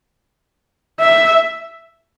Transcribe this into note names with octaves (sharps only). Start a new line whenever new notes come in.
E5